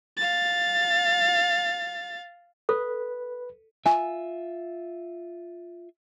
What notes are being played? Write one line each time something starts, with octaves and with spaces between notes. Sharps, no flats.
F5 A6
A4 B4
F4 E5 G#5